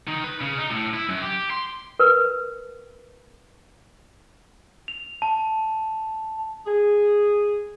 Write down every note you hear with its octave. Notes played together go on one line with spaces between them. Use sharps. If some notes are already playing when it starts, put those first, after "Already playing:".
D#3
B4
C#3
D#4
A2
E4
F#2
G4
C6
A#4 B4
F7
A5
G#4